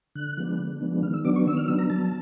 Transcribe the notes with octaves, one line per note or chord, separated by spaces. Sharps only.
D3 F#6
F3 G#3 B3 D4
D3
F3 G#3 B3 D4
D#3 F6
E6
F#3 B3 D4 D6
C#6
D#3 E6
F6
F#3 B3 D4 E6
A#5
F#3 A5